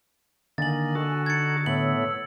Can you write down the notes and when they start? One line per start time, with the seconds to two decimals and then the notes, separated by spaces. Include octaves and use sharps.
0.58 D3 D#3 A#3 G#5 A6 F#7
0.95 F#4 A4
1.26 D#4 G#6 A6 C#7
1.66 A2 A3 B3 C#5 E6 F#7